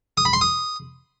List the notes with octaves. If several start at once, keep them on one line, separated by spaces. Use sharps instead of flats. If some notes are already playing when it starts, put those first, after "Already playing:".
D#6
B5
C6
D#6